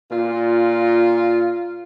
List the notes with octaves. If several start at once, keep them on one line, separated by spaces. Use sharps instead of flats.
A#2 F4